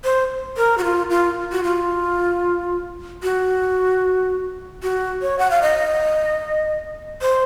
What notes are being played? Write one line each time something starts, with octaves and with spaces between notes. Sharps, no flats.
C5
A#4
F#4
F4
F4
F#4
F4
F#4
F#4
C#5
F#5
F5
D#5
C5